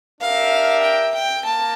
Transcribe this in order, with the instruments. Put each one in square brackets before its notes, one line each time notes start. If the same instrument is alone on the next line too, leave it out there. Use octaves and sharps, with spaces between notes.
[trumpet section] D4 G4 A#4 E5 [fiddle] F5
[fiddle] G5
G5
[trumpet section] A#3 [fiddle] A5